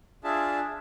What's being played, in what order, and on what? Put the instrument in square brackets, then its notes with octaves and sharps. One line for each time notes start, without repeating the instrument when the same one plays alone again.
[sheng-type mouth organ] D4 F4 G#4 E5 A5